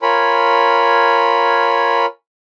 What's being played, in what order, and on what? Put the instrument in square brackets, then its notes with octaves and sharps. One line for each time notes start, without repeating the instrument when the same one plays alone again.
[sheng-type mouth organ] F4 A#4 C#5 G#5 B5